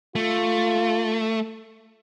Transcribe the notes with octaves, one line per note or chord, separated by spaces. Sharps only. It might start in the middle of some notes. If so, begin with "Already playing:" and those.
A3 F4